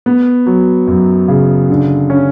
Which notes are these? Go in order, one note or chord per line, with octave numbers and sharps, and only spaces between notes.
B3
F#3
F#2
C#3
D3
C#4